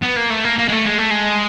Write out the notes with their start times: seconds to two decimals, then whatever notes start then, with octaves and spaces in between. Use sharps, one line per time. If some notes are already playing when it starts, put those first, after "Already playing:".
0.02 B3
0.16 A#3
0.30 A3
0.44 A#3
0.58 A#3
0.68 G#3
0.72 A3
0.86 G#3
0.98 A3
1.10 G#3